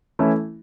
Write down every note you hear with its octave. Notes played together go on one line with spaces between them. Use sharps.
E3 A3 C#4 E4